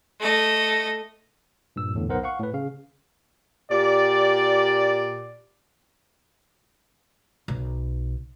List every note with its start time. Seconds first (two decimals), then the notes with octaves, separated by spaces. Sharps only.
0.20 A3 D#5
1.76 G2 A#2 E6
1.94 E2 A2 D3
2.09 B1 B3 D#4 A#4 C5 F#5
2.23 F5 F#5 C#6
2.39 A2 B4
2.54 C#3 F5
3.71 A#2 G4 D5
7.48 B1